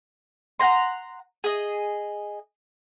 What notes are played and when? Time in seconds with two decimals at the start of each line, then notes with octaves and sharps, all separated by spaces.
0.60 F#5 G5 A#5 C6
1.44 G#4 D#5